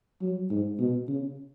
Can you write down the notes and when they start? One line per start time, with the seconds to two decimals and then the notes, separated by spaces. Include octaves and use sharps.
0.22 F#3
0.51 G#2
0.79 B2
1.09 C#3